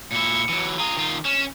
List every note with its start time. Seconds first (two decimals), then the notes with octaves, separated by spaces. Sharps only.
0.12 A#2 E4 C#7
0.49 E3 F#3
0.78 F4 G#4 A#5
0.97 D#3 F4
1.25 C#4 E7